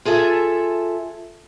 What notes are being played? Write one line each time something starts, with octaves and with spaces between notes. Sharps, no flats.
F4 G#4 A4 E5